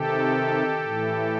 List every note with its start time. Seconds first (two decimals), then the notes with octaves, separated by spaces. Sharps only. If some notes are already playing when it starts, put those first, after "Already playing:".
Already playing: C3 D#3 G4 A4
0.83 A2 E3